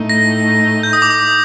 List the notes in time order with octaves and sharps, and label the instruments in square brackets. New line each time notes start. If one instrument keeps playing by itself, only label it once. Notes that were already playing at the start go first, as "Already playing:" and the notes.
Already playing: [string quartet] A2 A3 D#4
[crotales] A#6
G6
D#6
D6
D#6